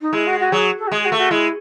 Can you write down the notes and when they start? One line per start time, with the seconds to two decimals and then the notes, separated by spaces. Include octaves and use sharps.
0.01 D#4
0.13 G#3 E4
0.26 F#4
0.39 F#4
0.52 F#3 G#4
0.78 A4
0.87 F#4
0.91 G#3 G#4
1.05 F#4
1.12 A3
1.18 F#4
1.30 G#3 E4